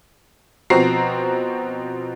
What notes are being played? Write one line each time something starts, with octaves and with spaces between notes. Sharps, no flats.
B2 F3 C4 F#4 A#5 C7